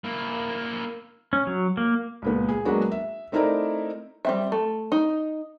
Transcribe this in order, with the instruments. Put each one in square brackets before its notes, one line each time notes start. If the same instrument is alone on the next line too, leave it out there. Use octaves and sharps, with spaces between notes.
[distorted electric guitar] A#3 E4
[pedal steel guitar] C#4
F#3
A#3
[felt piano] C#2 A#2 B3
G#4
F#3 G#3 A#3 B3 D4 F#4
E5
A3 C4 D#4 E4 A#4 D5
[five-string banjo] G3 C4 E5
A3
D#4